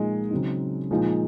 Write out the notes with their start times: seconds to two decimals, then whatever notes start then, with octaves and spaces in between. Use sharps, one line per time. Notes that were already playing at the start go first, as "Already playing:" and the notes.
Already playing: A#2 F3 G#3 D#4
0.31 C#3 F#3 C4 D#4
0.91 A#2 F3 G#3 D#4